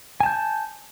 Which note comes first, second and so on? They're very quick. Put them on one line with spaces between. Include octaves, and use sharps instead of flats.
G#5 A5 G6